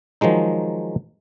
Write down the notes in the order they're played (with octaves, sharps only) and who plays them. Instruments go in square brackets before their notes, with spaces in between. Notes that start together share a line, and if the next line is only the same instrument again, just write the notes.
[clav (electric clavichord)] D#3 F3 F#3 G#3 D#4